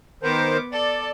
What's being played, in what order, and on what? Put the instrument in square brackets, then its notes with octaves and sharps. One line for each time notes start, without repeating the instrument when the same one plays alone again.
[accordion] D#3 A#4 C5 [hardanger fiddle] B3 D6
[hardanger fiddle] A4 [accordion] D5